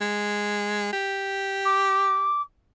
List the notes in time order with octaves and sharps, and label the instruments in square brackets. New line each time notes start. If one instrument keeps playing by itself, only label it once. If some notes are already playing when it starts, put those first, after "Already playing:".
[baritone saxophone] G#3
G4
[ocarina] D6